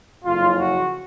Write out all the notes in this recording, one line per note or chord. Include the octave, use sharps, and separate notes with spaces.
F#1 F2 C#3 F4
F#4